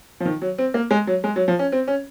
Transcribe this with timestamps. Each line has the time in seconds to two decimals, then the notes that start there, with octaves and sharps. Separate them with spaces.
0.20 F3
0.25 D#3
0.42 F#3
0.58 C4
0.74 A#3
0.91 G#3
1.07 F#3
1.24 G#3
1.36 F#3
1.48 F3
1.59 C#4
1.72 C4
1.88 C#4